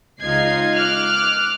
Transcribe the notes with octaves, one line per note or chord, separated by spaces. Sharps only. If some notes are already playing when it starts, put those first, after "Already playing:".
C#2 D#4 F4 D#5 G#6 C7
D6 F6 F#6